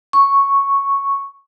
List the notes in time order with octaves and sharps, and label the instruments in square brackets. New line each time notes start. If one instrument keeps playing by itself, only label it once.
[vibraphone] C#6